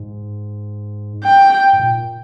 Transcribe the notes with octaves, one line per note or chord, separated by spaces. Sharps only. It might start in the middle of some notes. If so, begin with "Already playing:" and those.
Already playing: G#2
G5
G#2
A#2